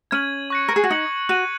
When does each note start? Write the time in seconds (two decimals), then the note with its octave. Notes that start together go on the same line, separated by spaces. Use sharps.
0.11 C#4 G#6 D#7 F#7
0.50 C#6 F#6 A#6 C#7
0.68 A#4
0.76 G#4
0.84 F#4
0.90 D#4 G#6 C#7 F#7
1.29 F#4 F#6 D#7 F#7